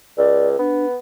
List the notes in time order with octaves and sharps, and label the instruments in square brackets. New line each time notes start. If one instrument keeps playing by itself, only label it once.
[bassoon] C#2 [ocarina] D5
[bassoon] B3 [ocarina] D4